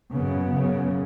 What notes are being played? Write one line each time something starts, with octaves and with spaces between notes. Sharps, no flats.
F#2 C#3 B3
F#2 C#3